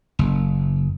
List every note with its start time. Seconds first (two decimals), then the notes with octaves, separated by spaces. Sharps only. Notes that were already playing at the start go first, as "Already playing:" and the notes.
0.19 F#1